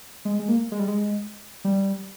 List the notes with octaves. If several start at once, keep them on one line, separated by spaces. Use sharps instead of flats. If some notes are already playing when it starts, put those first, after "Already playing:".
G#3
G#3
A#3
G#3
G3
G#3
G3